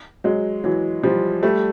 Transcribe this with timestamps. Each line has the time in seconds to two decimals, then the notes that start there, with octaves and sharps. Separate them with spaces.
0.24 F#3 G#3
0.64 E3 F#3
1.03 F3 G3
1.43 G3 A3